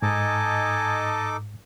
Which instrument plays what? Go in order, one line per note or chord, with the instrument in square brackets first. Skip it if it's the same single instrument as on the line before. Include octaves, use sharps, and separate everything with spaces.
[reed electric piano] G#2 [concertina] D#4 A4 D6 [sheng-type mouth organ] D#5 A5 [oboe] G#5